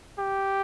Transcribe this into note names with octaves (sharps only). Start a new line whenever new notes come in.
G4